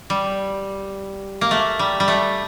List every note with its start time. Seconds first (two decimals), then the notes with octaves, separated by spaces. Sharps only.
0.10 G3
1.41 A#3
1.51 A3
1.79 G3
2.00 G3
2.08 A3